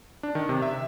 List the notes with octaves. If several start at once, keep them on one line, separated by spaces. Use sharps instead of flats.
D4
D#3
C3
E5